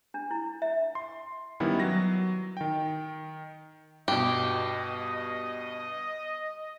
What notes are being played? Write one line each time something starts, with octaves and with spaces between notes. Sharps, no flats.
D4
E4
E5
C6
D#3 G3 B3 C#4 E4
F#3 A#6
D#3 G5
G2 B2 G4 D#5